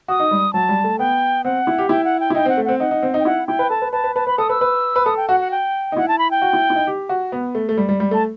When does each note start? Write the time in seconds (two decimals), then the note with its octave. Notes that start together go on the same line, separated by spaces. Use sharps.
0.08 F#4 D#6
0.20 D#4
0.31 G3
0.53 F#3 A5
0.69 G3
0.84 A3
0.99 B3 G5
1.44 C4 F#5
1.67 E4
1.78 G4
1.89 E4 G5
2.04 F#5
2.20 G5
2.30 E4
2.35 D#4 G5
2.46 C4 F#5
2.57 A3
2.65 C4 F#5
2.80 D#4 F#5
2.91 D#4
3.03 C4
3.14 D#4
3.20 G5
3.25 E4 F#5
3.47 E4 G5
3.59 B4
3.70 A4 A5
3.82 B4
3.92 B4 A5
4.04 B4
4.16 B4 A5
4.27 B4 B5
4.38 A4 D#6
4.49 B4 E6
4.61 B4
4.96 B4
5.06 A4 D#6
5.17 G5
5.29 F#4 F#5
5.40 F#5
5.51 G5
5.92 D#4
5.97 E4 F#5
6.08 A5
6.19 B5
6.31 G5
6.42 F#4
6.53 E4
6.70 E4
6.76 D#4
6.87 G4
7.09 F#4
7.32 B3
7.55 A3
7.69 A3
7.77 G3
7.89 G3
8.00 G3
8.11 A3 A5